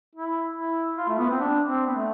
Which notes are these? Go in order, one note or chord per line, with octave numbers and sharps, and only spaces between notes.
E4
E4
F4
A3
B3
C4
D4
C4
B3
A3